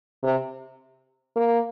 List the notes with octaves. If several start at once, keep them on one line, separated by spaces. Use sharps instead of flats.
C3
A#3